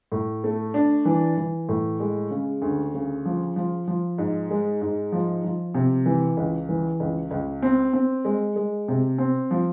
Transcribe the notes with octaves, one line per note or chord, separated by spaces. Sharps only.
A2
A3
D4
E3
E3
A2
G#3
C#3
D2
C#3
F3
F3
F3
G#2
G#3
G#2
F3
F3
C3
E3
C#2
E3
C#2
C#2
C4
C4
G#3
G#3
C3
C4
F3